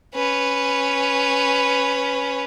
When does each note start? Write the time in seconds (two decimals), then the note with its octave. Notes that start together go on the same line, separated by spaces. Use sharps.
0.15 C#4 B4